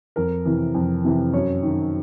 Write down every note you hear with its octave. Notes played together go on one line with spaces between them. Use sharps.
F2 A#4
C3 E3
F2
C3 E3
F#2 C#5
D#3